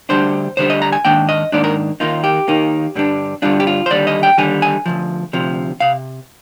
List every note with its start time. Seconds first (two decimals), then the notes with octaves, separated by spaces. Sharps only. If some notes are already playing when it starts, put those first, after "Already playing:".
0.09 D2 D3 G3 D4 C5
0.57 D2 D3 G3 D4 C5
0.70 D#5
0.82 A#5
0.92 G#5
1.05 G#2 D#3 A#3 D4 G5
1.29 D#5
1.52 G#2 D#3 A#3 D4 D5
1.64 A#4
2.00 D#2 D#3 A#3 D#4 F4
2.24 G4
2.48 D#2 D#3 A#3 D#4
2.95 G2 D3 G3 D4
3.42 G2 D3 G3 D4 F4
3.60 G4
3.67 F4
3.86 C5
3.90 D#2 D3 G3 D5
4.07 D#5
4.23 G5
4.38 D#2 D3 G3 G#5
4.62 G#5
4.86 D2 C3 F3
5.33 D2 C3 F3
5.80 C3 F5